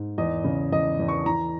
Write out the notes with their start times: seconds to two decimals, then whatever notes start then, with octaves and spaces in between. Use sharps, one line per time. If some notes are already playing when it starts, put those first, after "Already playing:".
Already playing: G#2
0.18 E2 D#5
0.44 C#3
0.72 E2 D#5
1.00 E2
1.08 C#6
1.26 E3 A#5